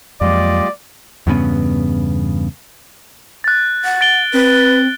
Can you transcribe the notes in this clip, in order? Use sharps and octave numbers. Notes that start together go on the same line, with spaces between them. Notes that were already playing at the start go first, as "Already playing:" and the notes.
F2 F#3 G#3 A#3 F4 G4 D5 D#5
E2 G2 C#3 B3
F#6 A6
F#5
A6 D7 G7
C4 B4